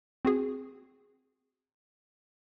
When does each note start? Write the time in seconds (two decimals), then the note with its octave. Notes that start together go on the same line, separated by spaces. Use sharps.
0.25 C4 F#4 G#4